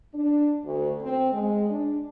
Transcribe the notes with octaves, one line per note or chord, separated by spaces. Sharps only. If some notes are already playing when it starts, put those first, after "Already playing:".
D4
D2
C4
G#3
D4